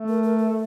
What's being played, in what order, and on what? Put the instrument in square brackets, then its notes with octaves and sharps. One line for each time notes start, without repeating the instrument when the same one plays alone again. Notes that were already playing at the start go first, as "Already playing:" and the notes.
Already playing: [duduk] A3
[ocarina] A#4
A#4
A4